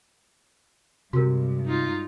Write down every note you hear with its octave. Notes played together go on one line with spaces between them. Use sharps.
G2 C3 G#3 F#4 A#4
D#4 F4